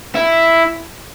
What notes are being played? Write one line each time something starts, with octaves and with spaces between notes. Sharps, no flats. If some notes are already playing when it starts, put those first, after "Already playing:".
E4